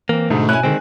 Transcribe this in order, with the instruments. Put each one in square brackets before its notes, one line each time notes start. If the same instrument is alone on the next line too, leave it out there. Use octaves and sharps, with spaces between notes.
[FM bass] E3 [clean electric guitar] A#3 C4
[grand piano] G#2 [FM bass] B2 [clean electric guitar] D3 [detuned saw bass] A3
[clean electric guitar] C#4 E4 [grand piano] G#5 F#6
[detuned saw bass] D3 [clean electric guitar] D#3 G#3 C4